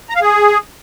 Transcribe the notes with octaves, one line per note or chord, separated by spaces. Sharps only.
A#5
F5
G#4